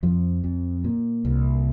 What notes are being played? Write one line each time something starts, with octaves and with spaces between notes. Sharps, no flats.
F2 F3
F2
A#2
C2